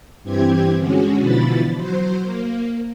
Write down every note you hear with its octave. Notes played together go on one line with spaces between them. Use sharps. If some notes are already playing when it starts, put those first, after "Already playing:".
G2 E3 C4 G4 G#6
D3 G#3 C#4 F#4
B2 D3 E3 F3 B5 A6
F#3 C5
A#3